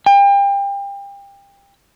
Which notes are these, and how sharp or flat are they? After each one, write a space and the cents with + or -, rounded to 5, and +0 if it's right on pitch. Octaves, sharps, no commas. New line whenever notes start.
G5 +30